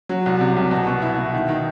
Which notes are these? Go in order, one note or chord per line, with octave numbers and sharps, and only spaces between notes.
F#3
C2
C3
C2
B2
B2
E4
B2
D#3
D#3